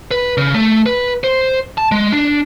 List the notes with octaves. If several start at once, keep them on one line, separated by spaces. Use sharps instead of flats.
B4
C#3
A3
B4
C5
A5
G#3
D4